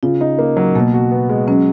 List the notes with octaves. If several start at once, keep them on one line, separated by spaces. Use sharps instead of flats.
C#3 F4
D#4
A#3
F#3
B2 A#3
F#4
B3
G#3
F#3 C#4